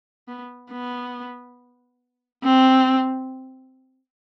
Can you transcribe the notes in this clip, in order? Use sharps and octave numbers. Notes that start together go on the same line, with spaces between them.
B3
B3
C4